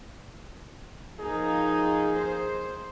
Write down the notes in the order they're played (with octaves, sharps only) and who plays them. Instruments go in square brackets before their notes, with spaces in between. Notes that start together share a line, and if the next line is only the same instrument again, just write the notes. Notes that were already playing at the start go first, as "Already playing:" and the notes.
[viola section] F3 A#3 D#4 [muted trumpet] G#4
[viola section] C5